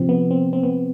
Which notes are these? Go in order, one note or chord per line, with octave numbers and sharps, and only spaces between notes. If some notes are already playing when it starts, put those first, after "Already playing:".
Already playing: C3 F3 C4
B3
C4
C4
B3